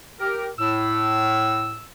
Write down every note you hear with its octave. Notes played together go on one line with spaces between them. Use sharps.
G4 A#4
A2 E6